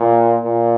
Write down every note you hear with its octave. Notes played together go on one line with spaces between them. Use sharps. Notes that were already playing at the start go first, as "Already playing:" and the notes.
Already playing: A#2
A#2